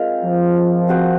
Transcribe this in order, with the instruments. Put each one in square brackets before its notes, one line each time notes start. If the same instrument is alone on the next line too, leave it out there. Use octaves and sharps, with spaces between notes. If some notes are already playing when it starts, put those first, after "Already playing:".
Already playing: [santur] G#3 C4 F4 A#4
[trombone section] F3
[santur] C4 F#4 C5